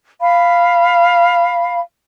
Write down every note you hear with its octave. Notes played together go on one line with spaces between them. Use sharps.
F5 B5